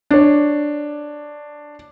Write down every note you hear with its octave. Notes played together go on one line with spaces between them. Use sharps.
D4 C#5